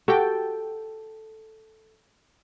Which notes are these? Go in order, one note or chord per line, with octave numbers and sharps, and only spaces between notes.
F#4 G4 A4 G5